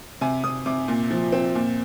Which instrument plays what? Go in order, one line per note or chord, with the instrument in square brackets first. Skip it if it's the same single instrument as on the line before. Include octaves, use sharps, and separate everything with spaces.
[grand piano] C3 G#5
C3 D#6
C3 D6
A#2
F3
C4
A#2